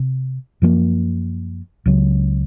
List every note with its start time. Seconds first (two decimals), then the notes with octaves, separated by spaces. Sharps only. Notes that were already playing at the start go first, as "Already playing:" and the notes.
Already playing: C3
0.62 F#2 F3 A#3
1.86 C#2 C#3 F#3